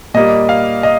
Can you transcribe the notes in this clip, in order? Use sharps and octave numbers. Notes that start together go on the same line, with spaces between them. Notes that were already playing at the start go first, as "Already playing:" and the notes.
A#2 G3 A#3 D#5
F5
D#5